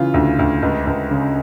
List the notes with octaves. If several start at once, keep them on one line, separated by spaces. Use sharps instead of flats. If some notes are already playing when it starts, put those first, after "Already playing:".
Already playing: C#3 E3 F4
D2
D2
C#2
C#2
C#3